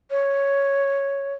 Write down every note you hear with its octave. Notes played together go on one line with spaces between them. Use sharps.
C#5